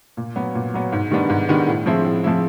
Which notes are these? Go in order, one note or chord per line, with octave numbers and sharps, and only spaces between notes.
A#2
F#3 B3
A#2
F#3 B3
G#2
D#3 G3 B3 D4
G#2
D#3 G3 B3 D4
A2
F3 G#3 C4 E4
A2
F3 G#3 C4 E4